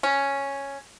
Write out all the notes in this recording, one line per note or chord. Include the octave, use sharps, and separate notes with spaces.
C#4